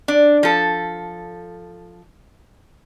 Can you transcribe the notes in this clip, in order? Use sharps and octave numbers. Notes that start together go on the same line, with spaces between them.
D4
F3 A4